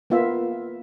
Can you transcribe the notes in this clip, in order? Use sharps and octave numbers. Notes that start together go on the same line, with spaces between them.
A#3 B3 F4 E5